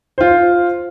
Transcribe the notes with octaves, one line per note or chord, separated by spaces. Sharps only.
F4 C5